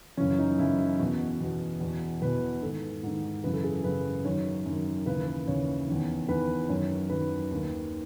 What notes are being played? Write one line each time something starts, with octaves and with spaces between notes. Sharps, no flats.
F#2 C#3 E3 C#4
D#4
F#2 C#3 E3 E4
E2 B2 F#4
E2 B2
E2 B2
E2 B2 B4
G#2 D#3 A4
G#2 D#3
F#2 C#3 E3 B4
A4
G#4
F#2 C#3 E3 B4
F#2 D#3 C#5
F#2 D#3
D#2 C#3 E3 B4
B4
D#2 C#3 E3 C#5
E2 D#3
E2 D#3 B4
F#2 D#3 C#5
F#2 D#3 B4
D#2 D#3